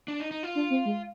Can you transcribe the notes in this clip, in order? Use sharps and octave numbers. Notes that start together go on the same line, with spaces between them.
D4
D#4
D#4
F4
D4
C4
G#3